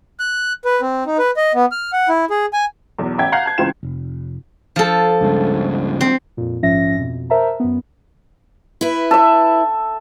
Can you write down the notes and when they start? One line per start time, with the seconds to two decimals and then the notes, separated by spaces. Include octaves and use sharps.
0.20 F#6
0.65 B4
0.81 C4
1.06 D#4
1.18 B4
1.37 D#5
1.54 B3
1.72 F6
1.93 F#5
2.09 E4
2.30 G#4
2.53 G#5
2.99 B1 E2
3.18 A1 E5 G5 G#6
3.32 F5 F#5 A#5 F#6 G6 C7
3.46 A5 G#6
3.58 C#2 E3 C4 F4 G5 E7
3.83 F1
4.76 F3 A4
5.21 C#2 G2 C#3
6.01 C4
6.37 F2 A#2
6.62 A#1 G#2 F3 C#4 E5 A#6
6.97 F2 B2
7.30 A#4 C5 E5 A5 A#5
7.60 F#2 B3
8.81 E4 B4
9.11 A4 E5